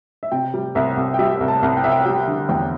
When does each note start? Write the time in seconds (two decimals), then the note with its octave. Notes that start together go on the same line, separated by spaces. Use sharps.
0.23 E5
0.32 C3 G5
0.54 G3
0.75 C2 E5
0.97 C2
1.14 G5
1.19 G3 E5
1.41 C2
1.48 A5
1.63 C2
1.77 G5
1.84 C2 E5
1.91 G5
2.06 G3 G5
2.27 D3
2.49 E2 G5